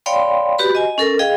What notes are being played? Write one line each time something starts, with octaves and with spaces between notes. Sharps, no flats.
C#5 D5 F5 G5 B5 C6
F#4 G4 B4 B5
D#5 G#5
C#4 A4 A#4
G#4 D#5 F5 G5